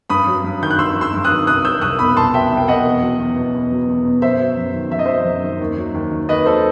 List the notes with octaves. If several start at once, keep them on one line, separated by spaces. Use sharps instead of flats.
G2 B5 D#6
F#3
G2
D#3 G6
F#6
G2 C6 E6
F#3
C6 E6
G2
D#6 F#6
D#3
C2 D#6 F#6
F#3 E6 G6
C2 D#6 F#6
B2 B5 D#6
C2 A5 C6
F#3 E5 G5
C2
G5
B2 D#5 F#5
E2
F#3
E2
B2
E2
F#3
E2
B2
F#2 C5 E5
F#3
F#2
D#3
F#2 E5
D#5
F#3 C5 E5
F#2
D#3
D#2
F#3
D#2
D#3
D#2 B4 D#5
F#3 A4 C5